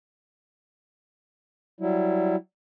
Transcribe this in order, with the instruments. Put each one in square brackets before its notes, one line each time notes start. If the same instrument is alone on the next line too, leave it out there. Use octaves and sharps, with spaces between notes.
[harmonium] F#3 G3 E4